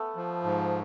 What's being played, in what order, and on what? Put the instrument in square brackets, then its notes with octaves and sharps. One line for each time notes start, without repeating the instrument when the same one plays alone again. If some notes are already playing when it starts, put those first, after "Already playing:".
Already playing: [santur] A3 B3
[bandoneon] F3
G#2